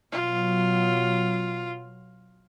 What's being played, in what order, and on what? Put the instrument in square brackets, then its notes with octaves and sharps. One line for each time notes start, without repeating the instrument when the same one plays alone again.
[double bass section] B2 F#3 [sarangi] F4